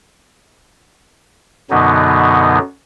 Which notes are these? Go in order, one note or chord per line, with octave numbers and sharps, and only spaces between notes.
F#2 B2 D3 F#3 B3 D#4